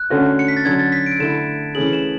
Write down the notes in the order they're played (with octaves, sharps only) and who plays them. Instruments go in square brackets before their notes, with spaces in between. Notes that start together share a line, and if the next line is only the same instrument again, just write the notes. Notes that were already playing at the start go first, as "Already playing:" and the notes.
Already playing: [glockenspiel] F#6
[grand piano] D3 A3 C#4 F#4
[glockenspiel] C#7
B6
A6
[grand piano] D3 F#3 C#4 [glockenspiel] G#6
[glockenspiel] A6
B6
D7
[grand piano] D3 A3 E4 [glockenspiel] E7
[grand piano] E3 A3 C#4 G#4 [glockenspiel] F#7
[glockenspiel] E7